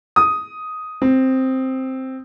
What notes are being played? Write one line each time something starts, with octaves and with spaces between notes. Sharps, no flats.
D#6
C4